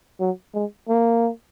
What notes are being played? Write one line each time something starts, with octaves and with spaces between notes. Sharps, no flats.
F#3
G#3
A#3